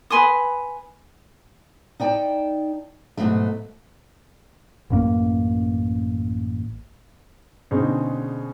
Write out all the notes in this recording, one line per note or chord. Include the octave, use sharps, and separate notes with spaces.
B4 G#5 C6 D#6
D#4 D5 G5 A5
G#2 B2 D#3 F#3 A3
A1 F#2 A#3
B2 D3 C4 C#4 D#4 G#4